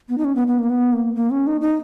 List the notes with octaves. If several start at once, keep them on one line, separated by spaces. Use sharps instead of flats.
B3
D#4
C#4
B3
B3
A#3
B3
A#3
A#3
C#4
D#4
D#4